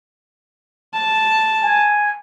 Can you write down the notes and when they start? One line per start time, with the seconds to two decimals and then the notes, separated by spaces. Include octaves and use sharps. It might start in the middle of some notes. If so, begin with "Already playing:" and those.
0.94 A5
1.62 G#5